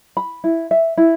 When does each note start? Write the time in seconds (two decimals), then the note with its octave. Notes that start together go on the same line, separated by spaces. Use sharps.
0.17 B5
0.44 E4
0.71 E5
0.97 E4